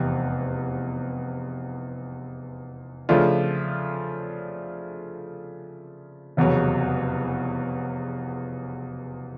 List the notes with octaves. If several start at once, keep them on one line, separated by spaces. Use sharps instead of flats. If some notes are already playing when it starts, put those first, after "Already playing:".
Already playing: F1 E2 C3
C#3 F3 A3 D4 F4
F1 E2 C#3 F#3